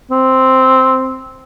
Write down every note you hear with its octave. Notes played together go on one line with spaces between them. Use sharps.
C4